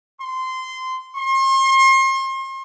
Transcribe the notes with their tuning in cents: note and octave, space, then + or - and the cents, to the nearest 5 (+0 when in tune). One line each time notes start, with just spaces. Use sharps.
C6 -15
C6 +40